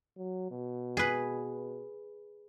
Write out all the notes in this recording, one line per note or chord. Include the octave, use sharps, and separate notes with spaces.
F#3
B2
G#4 B4